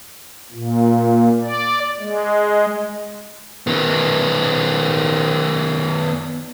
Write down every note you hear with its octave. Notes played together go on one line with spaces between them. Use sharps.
A#2
D5
G#3
D#3 B3